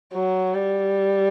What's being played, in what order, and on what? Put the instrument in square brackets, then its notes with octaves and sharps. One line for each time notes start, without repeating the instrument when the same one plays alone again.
[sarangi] F#3
G3